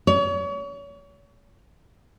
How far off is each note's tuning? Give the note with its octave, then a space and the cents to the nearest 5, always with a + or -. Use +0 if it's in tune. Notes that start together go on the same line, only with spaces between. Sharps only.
C#5 +35